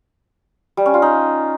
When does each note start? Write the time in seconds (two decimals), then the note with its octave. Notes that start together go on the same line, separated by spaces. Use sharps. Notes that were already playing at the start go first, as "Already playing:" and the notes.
0.77 G3
0.86 C#4
0.94 F4
1.02 D#4